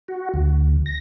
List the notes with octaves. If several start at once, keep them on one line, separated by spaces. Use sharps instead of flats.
F#4
D2
A#6